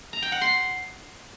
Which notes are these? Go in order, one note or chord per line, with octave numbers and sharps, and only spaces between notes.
A#5
G5
F#5
C6